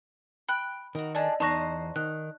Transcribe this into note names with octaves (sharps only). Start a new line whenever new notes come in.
G5 B5 F#6
D#3 F#4 A#4
A3 D4 G#4 D5 D#5
E2 D#4 C5 F#5 A5 C#6 A#6
D#3 F#6